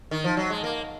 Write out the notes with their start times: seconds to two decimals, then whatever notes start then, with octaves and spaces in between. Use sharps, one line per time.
0.11 D#3
0.24 F3
0.37 F#3
0.50 G#3
0.64 A#3